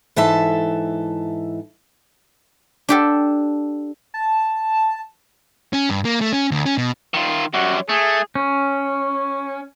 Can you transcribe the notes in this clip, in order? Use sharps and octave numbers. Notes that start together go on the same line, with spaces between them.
G#2 E3 A4 E5 A5
D4 G4 A4
A5
C#4
G2
A#3
A3
C#4
D2
C#4
B2
D#3 F4
F#2 G3 F#4
A3 G#4
C#4